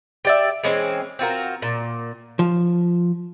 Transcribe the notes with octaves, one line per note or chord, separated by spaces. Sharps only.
G4 D5 E5
E3 G#3 C4 C#4
C4 F4 F#4 A#4
A#2
F3